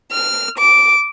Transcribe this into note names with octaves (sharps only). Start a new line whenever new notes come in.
F6
D6